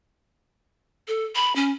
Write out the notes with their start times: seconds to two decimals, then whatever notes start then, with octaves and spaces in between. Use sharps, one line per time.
1.08 A4
1.35 B5
1.56 C#4